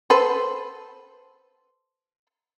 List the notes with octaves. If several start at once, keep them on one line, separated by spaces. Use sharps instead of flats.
A4 B4 C5